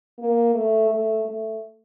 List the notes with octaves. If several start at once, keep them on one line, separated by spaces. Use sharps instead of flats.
A#3
A3
A3
A3